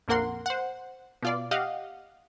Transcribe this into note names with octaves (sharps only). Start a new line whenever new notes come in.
A#1 F2 A#3 A#4 F#5 C6
C5 F#5
B2 F4 D5
G4 D#5 F5 F#5